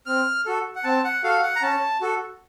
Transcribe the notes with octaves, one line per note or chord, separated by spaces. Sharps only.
C4 F6
F#4 A4
F#5
C4 A5
F#5
F#4 A4 F5
F#5
A#5
C#4 A5
F#4 A4